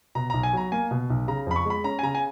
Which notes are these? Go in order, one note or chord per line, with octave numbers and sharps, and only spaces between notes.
B2 A#5
B1 A#5
G#5
F#3 A#5
A#3 G#5
B2
B1
C#3 A#5
F2 B5
C#6
G#3 B5
C#4 A#5
G#5
C#3 A#5
G#5